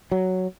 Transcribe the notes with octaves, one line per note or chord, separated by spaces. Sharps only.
F#3